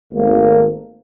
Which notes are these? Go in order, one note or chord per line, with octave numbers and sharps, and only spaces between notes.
G#1 A3 A#3